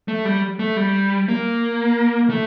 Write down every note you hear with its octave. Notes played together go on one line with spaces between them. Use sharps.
A3
G3
A3
G3
A#3
A3